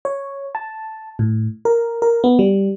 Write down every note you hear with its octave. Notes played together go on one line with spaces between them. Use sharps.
C#5
A5
A2
A#4
A#4
B3
G3